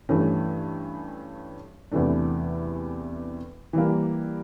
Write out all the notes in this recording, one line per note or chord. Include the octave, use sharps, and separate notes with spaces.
G2 E3 A3 C#4
E2 C3 E3 A3 D4
E3 G3 A#3